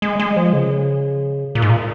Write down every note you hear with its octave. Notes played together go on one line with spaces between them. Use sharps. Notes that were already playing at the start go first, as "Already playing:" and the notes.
G#3
G#3
F3
C#3
A#2
G#2
A#2